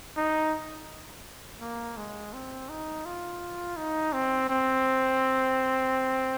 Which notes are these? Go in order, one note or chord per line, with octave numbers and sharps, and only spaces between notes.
D#4
A#3
G#3
C4
D#4
F4
D#4
C4
C4